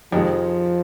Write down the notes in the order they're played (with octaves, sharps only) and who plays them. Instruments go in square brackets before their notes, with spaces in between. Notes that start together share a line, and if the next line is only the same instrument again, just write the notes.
[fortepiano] F2 C3 D#3 G#3 [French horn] F3